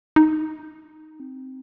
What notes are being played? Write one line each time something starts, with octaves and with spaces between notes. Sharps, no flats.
D#4
C4